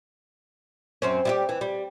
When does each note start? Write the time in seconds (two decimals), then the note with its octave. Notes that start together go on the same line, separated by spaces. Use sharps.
1.02 F#2 C4 C#4
1.25 G3 E4 G4
1.49 E3
1.61 G3